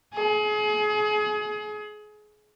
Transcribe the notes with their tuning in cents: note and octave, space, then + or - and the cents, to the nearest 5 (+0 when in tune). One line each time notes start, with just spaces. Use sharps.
G#4 +30